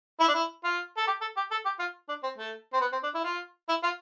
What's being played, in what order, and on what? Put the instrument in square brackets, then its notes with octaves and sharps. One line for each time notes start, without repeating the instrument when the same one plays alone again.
[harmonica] E4
D4
E4
F4
A4
G4
A4
G4
A4
G4
F4
D4
C4
A3
C4
B3
C4
D4
E4
F4
E4
F4